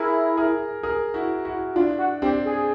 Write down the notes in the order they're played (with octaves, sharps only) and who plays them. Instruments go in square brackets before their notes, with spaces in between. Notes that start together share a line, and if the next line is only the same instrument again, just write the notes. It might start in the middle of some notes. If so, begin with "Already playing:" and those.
Already playing: [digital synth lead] E4 [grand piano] G#4 A#4
[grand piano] G#4 A#4
G#4 A#4
E4 F#4
E4 F#4
[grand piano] D4 E4 [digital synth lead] F4
[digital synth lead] F#4
[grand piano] C4 D4 [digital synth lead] G4
[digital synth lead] G#4